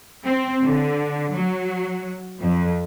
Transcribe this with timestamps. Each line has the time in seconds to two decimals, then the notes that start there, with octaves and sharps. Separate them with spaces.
0.24 C4
0.64 D3
1.31 F#3
2.40 F2